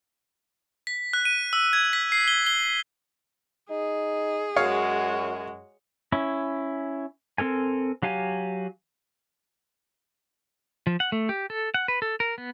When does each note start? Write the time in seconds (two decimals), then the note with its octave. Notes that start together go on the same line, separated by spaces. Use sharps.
0.87 B6
1.13 F#6
1.25 D#7
1.53 E6
1.73 G#6
1.93 B6
2.12 C7
2.28 G7
2.47 G7
3.70 D#4 G#4
4.56 F#2 G#3 F#4 C#5 F5 C#6
6.12 C#4 E4
7.38 C4 A4 A#4 G#5
8.02 F#3 G4 F5 G#5
10.87 F3
11.00 F#5
11.12 A3
11.29 G4
11.50 A4
11.74 F#5
11.88 B4
12.02 A4
12.20 A#4
12.38 B3